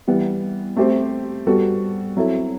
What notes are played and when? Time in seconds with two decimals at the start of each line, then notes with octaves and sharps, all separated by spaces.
0.07 E3 G3 B3
0.77 A3 C4 G4 C5
1.47 G3 B3 F#4 A4
2.16 F#3 C4 E4 A4